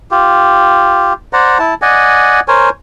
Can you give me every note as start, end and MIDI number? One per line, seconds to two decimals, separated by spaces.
0.11 1.13 65
0.11 1.13 67
1.33 1.58 72
1.33 1.58 74
1.33 1.58 78
1.33 1.58 82
1.59 1.74 64
1.59 1.74 81
1.82 2.40 74
1.82 2.40 75
1.82 2.40 78
1.82 2.40 80
2.48 2.70 70
2.48 2.70 72
2.48 2.70 73
2.48 2.70 80